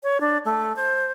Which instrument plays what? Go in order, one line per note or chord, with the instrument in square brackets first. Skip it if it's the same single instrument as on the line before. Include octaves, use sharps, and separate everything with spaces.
[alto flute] C#5
D4
A3
C5